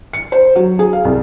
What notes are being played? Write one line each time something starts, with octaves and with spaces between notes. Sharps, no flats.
C#7
C5
F#3
G#4
F5
C2